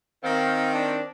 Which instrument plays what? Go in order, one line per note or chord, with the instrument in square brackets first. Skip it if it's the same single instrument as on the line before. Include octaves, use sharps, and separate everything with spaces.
[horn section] D#3 C4 [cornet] F5
[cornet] D4